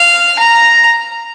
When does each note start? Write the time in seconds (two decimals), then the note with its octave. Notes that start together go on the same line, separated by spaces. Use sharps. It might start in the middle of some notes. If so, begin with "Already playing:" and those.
Already playing: F5
0.39 A#5